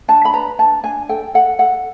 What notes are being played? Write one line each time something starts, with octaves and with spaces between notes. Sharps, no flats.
D4 A5
B5
B4 A#5
D4 A5
D4 G#5
A4 G5
A4 F#5
A4 F#5